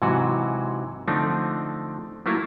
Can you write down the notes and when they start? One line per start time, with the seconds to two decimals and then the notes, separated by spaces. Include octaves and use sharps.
0.02 G#2 C3 E3 F#3 F#4
1.08 D3 F3 A3 C4 D4 D#4
2.26 F#3 A3 A#3 E4 F4